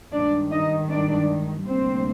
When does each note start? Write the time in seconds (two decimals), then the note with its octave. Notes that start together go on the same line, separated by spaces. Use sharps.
0.12 G2 D#3 G#3 D4 D5
0.51 D#4 D#5
0.90 D4 D5
1.66 D2 C3 G3 A#3 C4 D4 C5